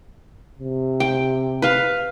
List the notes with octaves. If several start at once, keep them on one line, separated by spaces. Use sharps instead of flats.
C3
G5
B4 F5